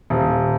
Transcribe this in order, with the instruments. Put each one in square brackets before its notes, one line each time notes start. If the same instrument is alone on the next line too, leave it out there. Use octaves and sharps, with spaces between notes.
[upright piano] D#1